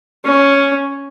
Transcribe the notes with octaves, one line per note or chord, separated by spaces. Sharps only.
C#4